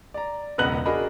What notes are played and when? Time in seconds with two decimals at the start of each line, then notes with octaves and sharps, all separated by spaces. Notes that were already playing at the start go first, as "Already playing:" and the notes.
0.14 D5 A#5
0.58 E1 C#2 B3 D#5 F#6 F#7
0.86 D4 F#4 G#4 A#4 D#5 B5